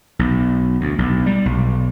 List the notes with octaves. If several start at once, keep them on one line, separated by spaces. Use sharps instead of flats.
B1
D2
B1
G3
B1